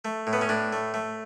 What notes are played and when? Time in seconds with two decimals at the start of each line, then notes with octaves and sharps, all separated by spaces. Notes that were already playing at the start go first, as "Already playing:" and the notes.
0.05 A3
0.27 A2
0.33 B3
0.41 C#4
0.49 A2 D4
0.73 A3
0.94 A3